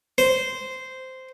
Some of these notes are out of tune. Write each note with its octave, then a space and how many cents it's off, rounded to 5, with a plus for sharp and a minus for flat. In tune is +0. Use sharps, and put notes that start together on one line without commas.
C5 -10